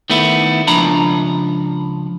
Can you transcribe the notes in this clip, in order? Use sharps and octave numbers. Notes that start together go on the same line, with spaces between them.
D#3 A3 B3 E4
C#2 F3 D4 A#5 B5